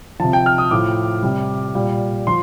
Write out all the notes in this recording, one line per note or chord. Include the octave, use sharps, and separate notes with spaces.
C3 F3 A5
G5
F6
D#6
A2 F3 D6
C3 G3
A#2 G3
F3 C6